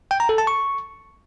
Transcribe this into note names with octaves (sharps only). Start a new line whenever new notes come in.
G5
A#5
A4
A5
C#6